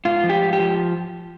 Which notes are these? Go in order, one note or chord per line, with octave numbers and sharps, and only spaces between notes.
G#2 F4
F3
G4
G#2
G4
F3